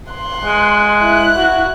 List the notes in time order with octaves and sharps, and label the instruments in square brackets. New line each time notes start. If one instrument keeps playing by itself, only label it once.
[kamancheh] C6 F#6
[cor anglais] G#3
[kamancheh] E4 F#6
[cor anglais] F#4